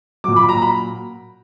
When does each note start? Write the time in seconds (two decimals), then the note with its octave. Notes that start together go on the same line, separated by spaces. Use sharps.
0.24 A#2 F#3 D6
0.36 B5
0.49 A#5
0.62 B5